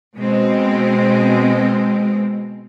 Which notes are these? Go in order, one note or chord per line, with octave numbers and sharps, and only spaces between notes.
B2 G#3 C4